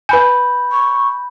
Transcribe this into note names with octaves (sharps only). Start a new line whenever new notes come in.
B4 G#5 B5 G6
C#6